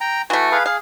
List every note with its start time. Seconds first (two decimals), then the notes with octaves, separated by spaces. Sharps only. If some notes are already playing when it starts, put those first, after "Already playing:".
0.01 G5 A#5
0.30 E3 A3 F#4
0.52 G#4 B4 F5
0.66 G#4 F5